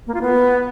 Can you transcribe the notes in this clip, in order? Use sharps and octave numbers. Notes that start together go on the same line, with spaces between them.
A#3
F4
B3